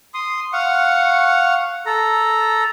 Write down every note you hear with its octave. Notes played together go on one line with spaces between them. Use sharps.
C6 D#6
F5 F#5 C#6
A4 A#5